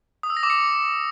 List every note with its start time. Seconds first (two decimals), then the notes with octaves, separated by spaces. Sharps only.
0.23 D#6
0.30 E6
0.37 A#6
0.43 D6
0.50 C#7